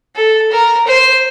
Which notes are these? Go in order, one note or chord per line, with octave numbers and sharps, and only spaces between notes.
A4
A#4
C5